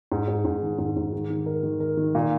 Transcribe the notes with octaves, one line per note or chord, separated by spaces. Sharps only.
G#2
G#2
G#2
D#3
G#2
G#2
D#3
D#3
A#4
D#3
A#4
D#3
A#2